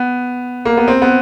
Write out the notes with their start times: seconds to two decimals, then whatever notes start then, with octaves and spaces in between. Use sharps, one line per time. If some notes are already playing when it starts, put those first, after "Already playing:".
Already playing: B3
0.65 A#3
0.77 B3
0.88 C4
1.02 B3